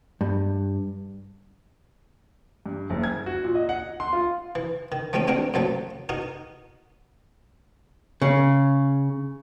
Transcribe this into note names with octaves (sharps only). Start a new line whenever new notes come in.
G2
G2
F#1
G#6
F#4
A#2
D#5
F#5
C6
F4
E3
D#3
F3 G#3 A3 C4 C#4
G#3 C4 D4 F#4 A#4
F#2 F3 F#3 A3
D#4 F#4 A#4
C#3